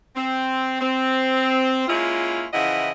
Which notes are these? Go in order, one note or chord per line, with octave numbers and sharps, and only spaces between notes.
C4
C4
G#3 A#3 C#4 E4 F4
C#3 E3 F3 E4 D#5 F#5